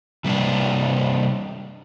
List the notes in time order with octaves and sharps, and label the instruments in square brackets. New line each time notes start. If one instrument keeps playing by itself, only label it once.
[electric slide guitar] C3 G3 A#3 D4